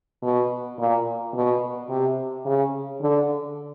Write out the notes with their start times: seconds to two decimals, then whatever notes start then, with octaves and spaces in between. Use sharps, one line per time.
0.23 B2
0.78 A#2
1.34 B2
1.89 C3
2.45 C#3
3.01 D3